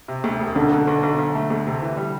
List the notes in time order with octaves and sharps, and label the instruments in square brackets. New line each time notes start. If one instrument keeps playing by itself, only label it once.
[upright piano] C3
D2
E1
[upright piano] B1 [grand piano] D3
[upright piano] B2
B1
B1
B1
A3
D2
C3
E3
G3